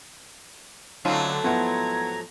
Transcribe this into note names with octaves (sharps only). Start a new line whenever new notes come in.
D3 F#3 A3 C4 C#4 D#4 F4
G#2 F3 B3 E4 F#5 A#5 G#6